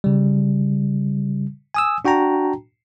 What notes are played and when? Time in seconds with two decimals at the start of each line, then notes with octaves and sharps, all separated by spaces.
0.04 C#3 G3
1.74 G#5 D#6 E6
2.05 D4 F#4 G5 A5 A#5